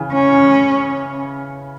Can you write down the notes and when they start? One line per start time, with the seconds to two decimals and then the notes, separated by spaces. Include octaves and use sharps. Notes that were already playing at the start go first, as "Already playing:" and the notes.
Already playing: C#3 E3
0.14 C#4